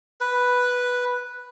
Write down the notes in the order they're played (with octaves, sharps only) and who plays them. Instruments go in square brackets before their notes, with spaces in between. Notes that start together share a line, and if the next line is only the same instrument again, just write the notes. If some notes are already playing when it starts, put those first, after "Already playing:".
[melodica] B4